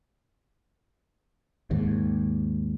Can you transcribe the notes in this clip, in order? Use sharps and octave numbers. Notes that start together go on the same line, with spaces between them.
D#2 G#2